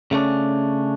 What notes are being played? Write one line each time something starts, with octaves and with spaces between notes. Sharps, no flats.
C#3 A3 C#4 D4